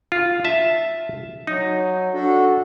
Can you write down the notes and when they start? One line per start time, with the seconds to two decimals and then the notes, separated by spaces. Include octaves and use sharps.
0.12 F4
0.45 E5 A5
1.47 F#3 D#4
2.14 D4 F#4 A4